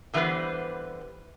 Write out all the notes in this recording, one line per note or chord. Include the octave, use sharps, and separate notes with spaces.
D3 E3 G3 B3 B4 C5